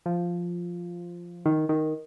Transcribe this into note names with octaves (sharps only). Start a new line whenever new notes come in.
F3
D#3
D#3